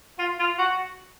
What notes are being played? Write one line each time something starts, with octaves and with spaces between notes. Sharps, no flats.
F4
F4
F#4